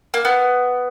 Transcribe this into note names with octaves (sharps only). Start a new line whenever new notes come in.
A#3
B3